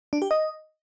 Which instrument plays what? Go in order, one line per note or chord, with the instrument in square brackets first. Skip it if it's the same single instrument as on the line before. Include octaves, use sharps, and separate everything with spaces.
[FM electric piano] D4
G4
D#5